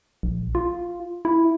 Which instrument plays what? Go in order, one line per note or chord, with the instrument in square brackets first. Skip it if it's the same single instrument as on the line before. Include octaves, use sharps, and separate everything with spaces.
[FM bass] A#1
F4
E4